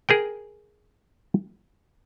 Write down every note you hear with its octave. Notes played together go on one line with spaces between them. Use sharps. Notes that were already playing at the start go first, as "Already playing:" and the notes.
G#4 A#4 G5